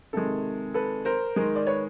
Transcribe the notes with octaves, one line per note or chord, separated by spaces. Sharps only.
C3 D#3 G#3 A4
A4 B4
A#4 C5
D#3 G#3
D5
B4 C#5